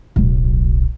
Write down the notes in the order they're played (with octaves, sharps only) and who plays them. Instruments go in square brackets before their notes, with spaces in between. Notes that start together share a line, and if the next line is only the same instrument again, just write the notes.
[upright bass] D1 B1